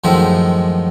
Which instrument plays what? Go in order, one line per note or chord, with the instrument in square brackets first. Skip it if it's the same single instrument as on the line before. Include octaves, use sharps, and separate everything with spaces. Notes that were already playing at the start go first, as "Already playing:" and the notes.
[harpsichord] F#2 A2 D#3 F3 G#3 E5